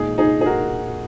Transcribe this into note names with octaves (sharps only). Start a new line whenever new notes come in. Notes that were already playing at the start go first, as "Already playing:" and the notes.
Already playing: A#2 G#3 D#4 G#4
D#4 G#4
G#4
F#4 A#4